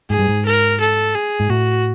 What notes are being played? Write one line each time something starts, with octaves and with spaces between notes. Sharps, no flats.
G#2 G#4
G2
G#2
A#4
A4
G#4
G#2
A2 F#4